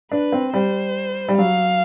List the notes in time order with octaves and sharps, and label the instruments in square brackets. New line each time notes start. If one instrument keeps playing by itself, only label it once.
[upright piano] D4 [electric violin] B4
[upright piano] C4
[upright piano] G3 [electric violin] C5
[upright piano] G3
[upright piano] F#3 [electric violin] F5